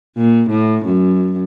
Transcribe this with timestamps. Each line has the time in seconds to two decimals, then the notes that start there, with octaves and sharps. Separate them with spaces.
0.17 A#2
0.50 A2
0.85 F#2